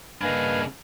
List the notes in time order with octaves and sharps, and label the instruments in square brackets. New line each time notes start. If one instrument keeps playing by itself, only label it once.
[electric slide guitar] G2 A#3 D#5 [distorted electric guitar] C#3 D4 [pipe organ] B4 F5 G#5